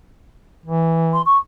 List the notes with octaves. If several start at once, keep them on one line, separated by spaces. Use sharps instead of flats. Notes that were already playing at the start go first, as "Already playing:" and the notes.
E3
C6
C#6